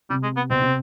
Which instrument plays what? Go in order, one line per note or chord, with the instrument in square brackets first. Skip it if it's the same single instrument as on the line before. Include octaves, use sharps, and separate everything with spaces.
[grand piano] C3 [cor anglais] G3
[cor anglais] G#3
B3
[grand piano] B2 [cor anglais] C4
[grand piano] C3